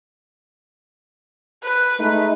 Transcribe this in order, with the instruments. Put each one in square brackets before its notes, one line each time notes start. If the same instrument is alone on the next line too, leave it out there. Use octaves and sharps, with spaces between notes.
[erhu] B4
[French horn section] G#3 A3 D#4